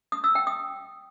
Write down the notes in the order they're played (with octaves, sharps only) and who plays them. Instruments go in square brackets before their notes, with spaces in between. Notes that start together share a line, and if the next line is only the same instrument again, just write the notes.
[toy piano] D#6
E6
G5
D#6